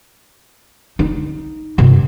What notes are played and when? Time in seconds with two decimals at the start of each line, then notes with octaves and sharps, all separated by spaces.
0.99 D#4
1.78 G2 C3